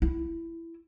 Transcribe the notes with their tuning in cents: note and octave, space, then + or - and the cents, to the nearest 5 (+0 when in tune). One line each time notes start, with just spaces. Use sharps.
E4 +10